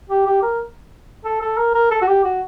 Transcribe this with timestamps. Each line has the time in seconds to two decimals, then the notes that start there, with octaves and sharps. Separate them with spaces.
0.10 G4
0.26 G4
0.43 A#4
1.24 A4
1.41 A4
1.57 A#4
1.74 A#4
1.91 A4
2.02 F#4
2.08 G4
2.24 F#4